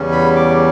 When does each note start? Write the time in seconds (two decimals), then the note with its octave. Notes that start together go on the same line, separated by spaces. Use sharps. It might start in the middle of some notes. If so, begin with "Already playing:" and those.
Already playing: E2 C#3 G3 C#4
0.12 B5
0.36 D6